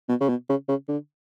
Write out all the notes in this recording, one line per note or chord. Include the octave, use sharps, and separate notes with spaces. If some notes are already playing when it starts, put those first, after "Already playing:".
B2
C#3
B2
C#3
C#3
D3